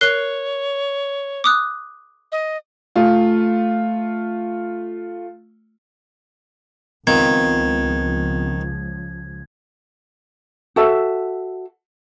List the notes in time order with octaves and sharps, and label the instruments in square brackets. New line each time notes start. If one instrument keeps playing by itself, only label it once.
[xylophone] A#4 F#6 C7 [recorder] C#5
[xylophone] D6 D#6 F#6
[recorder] D#5
[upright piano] A3 F4
[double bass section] C#2 F3 [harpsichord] D#3 [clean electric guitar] B3 C4 F4 [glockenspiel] G#6
[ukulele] F#4 A4 E5